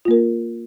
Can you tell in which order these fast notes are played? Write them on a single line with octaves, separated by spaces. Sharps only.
F4 A#3 A#4